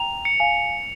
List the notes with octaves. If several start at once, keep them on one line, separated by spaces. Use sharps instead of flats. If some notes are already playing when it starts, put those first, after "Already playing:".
Already playing: G5 A#5 F7
C#7
F5 G#5